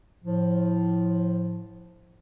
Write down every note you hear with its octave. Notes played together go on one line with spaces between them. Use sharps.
A2 F3